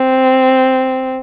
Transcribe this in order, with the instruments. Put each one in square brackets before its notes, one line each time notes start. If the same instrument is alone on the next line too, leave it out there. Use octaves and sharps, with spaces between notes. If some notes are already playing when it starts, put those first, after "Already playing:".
Already playing: [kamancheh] C4